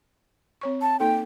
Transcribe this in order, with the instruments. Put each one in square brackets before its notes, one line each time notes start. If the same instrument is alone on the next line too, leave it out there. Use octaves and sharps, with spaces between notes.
[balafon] C4 C#5 C#6
[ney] A5
[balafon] A#3 D#4 A4 [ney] G5